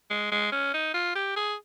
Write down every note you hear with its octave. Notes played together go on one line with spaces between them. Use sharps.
G#3
G#3
C#4
D#4
F4
G4
G#4